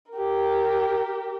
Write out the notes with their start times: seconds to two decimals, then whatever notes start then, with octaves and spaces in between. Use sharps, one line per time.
0.12 G4 A#4